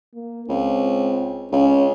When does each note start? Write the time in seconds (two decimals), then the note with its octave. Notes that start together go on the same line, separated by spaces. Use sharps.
0.15 A#3
0.48 C#2 C4
1.52 C#2 C#4